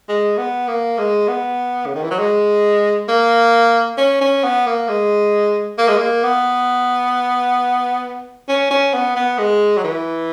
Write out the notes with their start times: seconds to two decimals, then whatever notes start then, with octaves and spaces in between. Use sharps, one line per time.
0.09 G#3
0.38 B3
0.68 A#3
0.98 G#3
1.28 B3
1.86 C#3
1.94 D#3
2.03 E3
2.10 F#3
2.19 G#3
3.08 A#3
3.98 C#4
4.21 C#4
4.44 B3
4.67 A#3
4.89 G#3
5.78 A#3
5.88 G#3
5.97 A#3
6.24 B3
8.49 C#4
8.70 C#4
8.94 B3
9.16 B3
9.38 G#3
9.77 F#3
9.84 E3